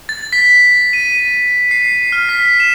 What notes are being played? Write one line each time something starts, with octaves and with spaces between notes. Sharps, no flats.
A6
B6
D#7
C7
F6
B6
E7